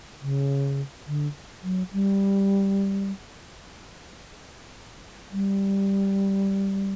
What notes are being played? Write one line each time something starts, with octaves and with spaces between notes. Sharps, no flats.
C#3
D3
F#3
G3
G3